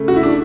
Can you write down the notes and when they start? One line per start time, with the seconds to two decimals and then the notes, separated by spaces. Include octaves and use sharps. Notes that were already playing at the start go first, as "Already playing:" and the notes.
Already playing: C#3 A3
0.08 F#4
0.16 E4
0.23 D4